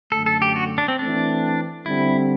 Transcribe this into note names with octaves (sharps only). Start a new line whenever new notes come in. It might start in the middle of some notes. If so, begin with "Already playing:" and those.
F#2 D3 A3 A4
A4
G4
F#4
D4
C4
E3 A3 C4 D4
D3 G3 C4 E4